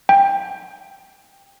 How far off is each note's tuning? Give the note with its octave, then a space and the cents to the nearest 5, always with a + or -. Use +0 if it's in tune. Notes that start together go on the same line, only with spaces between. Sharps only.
G5 +15